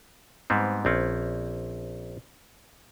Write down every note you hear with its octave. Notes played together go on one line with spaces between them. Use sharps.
G#2 G3 B3 C4
A#1 C4 C#4